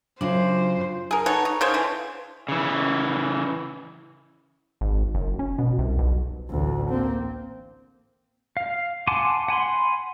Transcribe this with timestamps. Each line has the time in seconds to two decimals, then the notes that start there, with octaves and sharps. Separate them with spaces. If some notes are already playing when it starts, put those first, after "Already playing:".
0.21 F#2 C#3 F#3 D4 F4 C5
1.11 G#4 A#4
1.26 B3 D#4 A4 C#5
1.45 D#4
1.61 C#3 A#3 C5 C#5
1.74 D3 E3
2.48 C#3 E3
4.81 G#1
5.15 F#1
5.39 C#4
5.58 B2
5.78 C2
5.99 B1
6.49 A1 D2
6.90 A#3 C4
8.57 F5
9.07 F#5 G#5 A5 C6 D6
9.48 F#5 G#5 B5 C6